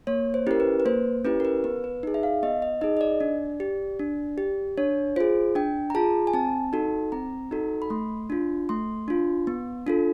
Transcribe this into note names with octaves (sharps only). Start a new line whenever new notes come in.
A#3 C#5
C5
C#4 E4 G4 A#4
B4
B4
A#3 C5
C#4 E4 G4 B4
A#4
B4
B3 B4
B4
D#4 G#4
E5
F5
B3 D#5
D#5
D#4 G#4 D#5
D#5
D5
D4
G4
D4
G4
D4 C#5
F4 G#4 C5
D4 G5
A#5
F4 G#4 A5
G#5
C4 A5
D#4 F#4 A4
C4 A#5
D#4 F#4 A4
B5
A3 C6
D4 F4
A3 C6
D4 F4
B3
D4 F4 A4